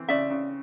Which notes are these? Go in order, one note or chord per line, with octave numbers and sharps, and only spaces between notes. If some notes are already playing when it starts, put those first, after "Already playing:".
Already playing: E3 C4
C#3 D5 E5
C#3